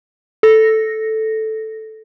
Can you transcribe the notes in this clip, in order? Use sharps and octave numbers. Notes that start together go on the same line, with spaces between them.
A4 A#6